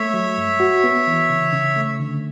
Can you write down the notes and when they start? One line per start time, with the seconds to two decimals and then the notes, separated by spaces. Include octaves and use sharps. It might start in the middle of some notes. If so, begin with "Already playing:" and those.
Already playing: A3 C#5 E5
0.14 F#3
0.37 G2
0.60 F#4
0.84 B3
1.07 E3
1.30 C#3
1.52 C#3
1.76 A3
2.00 D3